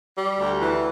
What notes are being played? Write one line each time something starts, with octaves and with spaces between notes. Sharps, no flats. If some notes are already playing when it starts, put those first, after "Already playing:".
G3
D2
E3